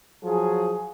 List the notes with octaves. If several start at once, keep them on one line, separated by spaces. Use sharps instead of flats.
F3 F#3 G#4